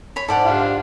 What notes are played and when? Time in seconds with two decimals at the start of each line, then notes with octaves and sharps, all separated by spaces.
0.16 C#5 B5
0.28 G#2 A4 D5 F#5
0.45 D4 F4 G4